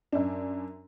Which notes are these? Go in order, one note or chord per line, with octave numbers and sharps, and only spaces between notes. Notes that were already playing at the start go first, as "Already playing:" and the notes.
F#2 D4